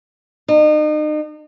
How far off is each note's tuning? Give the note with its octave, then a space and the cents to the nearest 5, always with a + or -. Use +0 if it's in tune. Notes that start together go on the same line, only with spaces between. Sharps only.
D#4 -35